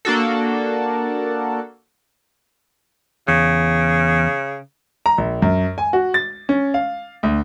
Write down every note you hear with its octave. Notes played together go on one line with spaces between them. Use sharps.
A#3 D4 F#4 A4
E2 C#3
A#5
A#1
F#2
G#5
F#4
A6
C#4
F5
D2